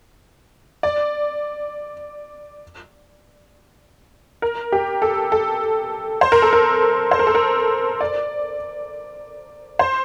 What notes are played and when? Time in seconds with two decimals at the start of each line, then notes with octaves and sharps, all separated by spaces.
0.83 D5
4.42 A#4
4.72 G4
5.02 A4
5.32 A4
6.21 C5
6.32 A#4
6.42 A4
6.53 A#4
7.11 C5
7.19 A#4
7.27 A4
7.35 A#4
8.01 D5
9.79 C5